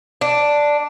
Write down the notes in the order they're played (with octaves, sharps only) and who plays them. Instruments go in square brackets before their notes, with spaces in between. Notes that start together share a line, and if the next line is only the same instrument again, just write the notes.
[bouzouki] D4